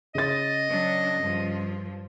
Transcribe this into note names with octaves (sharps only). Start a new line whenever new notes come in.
C#3 D#5 A6
F#3 D4
G2 F3